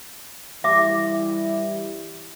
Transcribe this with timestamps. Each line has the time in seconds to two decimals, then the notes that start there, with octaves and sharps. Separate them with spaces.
0.64 E3 G3 E4 E5 D6